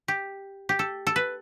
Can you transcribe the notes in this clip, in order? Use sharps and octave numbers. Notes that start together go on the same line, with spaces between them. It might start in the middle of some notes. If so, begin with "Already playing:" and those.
G4
G4
A4
A4
B4